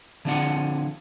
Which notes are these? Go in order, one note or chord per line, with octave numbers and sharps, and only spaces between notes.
D3 F3 C4 D4 G#4 F#5